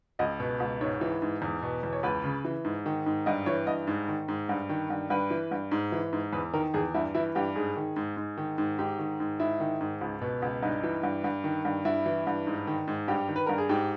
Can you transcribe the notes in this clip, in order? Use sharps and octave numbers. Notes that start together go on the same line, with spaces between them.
C#2 D#5
B2
C#2
G#2 C#5
E3
G#2
E2
B2
E2
C#5
C#2 B4
C#3
E3
G#2
D#3
G#2
G2 D#5
E3 C#5
G2 D#5
G#2
D#3
G#2
G2
D#3
G2
G2 B4
E3
G2
G#2
E3
G#2
E2 B4
D#3 A#4
E2 G#4
G2 E4
E3 E4
G2 G4
G#2 G#4
D#3
G#2
G#2
D#3
G#2
G#2 G4
D#3
G#2
G#2 E4
D#3
G#2
C#2
B2
C#2
G2 D#4
E3
G2
G2
D#3
G2
G2 E4
E3
G2
G#2
D#3
G#2
G2 G4
D#3
B4
G2 A#4
G#4
G#2 G4